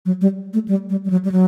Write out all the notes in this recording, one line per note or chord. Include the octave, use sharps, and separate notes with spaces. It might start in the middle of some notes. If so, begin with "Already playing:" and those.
F#3
G3
A3
G3
G3
G3
F#3
G3
F#3